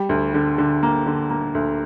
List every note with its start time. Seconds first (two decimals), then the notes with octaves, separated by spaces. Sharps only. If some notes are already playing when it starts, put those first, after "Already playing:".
Already playing: G3
0.09 D2
0.34 D3
0.58 D3
0.83 A#3
1.06 D3
1.30 A#3
1.55 D2